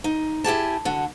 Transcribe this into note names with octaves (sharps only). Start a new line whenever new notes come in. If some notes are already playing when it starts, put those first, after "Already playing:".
D#4
E4 G4 G#4 A5
D3 F#4